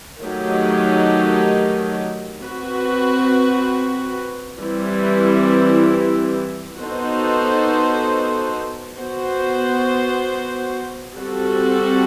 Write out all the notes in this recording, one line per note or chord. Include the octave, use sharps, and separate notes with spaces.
D#3 F#3 A3 D#4 G4
C4 F#4 B4
E3 G3 C4 E4
B3 D#4 F#4 A4 C5
B3 F#4 C5
G3 C4 F#4 A4